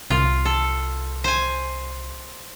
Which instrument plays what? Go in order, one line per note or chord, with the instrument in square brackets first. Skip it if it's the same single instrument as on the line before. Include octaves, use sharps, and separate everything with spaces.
[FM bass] C2 [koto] F4
[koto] A4
C5 G#5